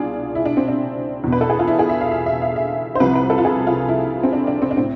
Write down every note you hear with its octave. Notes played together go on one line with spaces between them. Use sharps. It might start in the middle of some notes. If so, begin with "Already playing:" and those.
Already playing: C2 B2 D4 F4 G#4
E4
D4
C4
D4
E2 B2
B4
A4
G#4
F4
E4
G#4
E5
F5
E5
E5
F5
E5
C5
C2 C3 F3 B4
B4
A4
F4
G#4
F4
E4
C4
D4
D4
C4
D4
A2 C4